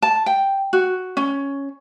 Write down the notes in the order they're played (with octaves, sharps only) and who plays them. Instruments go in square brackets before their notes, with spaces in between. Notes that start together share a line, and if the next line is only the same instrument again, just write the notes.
[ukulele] A5
G5
F#4
C#4